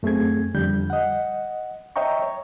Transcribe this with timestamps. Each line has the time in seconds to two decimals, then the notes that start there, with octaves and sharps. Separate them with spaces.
0.03 F#2 A3 C4 G#4 G#6
0.54 F2 D3 G3 G6
0.90 D#5 F#5
1.96 C#5 D#5 E5 G5 A#5 C#6
2.22 C#5